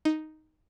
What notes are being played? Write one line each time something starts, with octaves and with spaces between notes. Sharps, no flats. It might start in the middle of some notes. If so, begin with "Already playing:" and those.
D#4